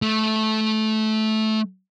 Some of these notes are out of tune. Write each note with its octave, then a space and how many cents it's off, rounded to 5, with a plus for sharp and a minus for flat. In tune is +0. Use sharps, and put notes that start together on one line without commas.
A3 -15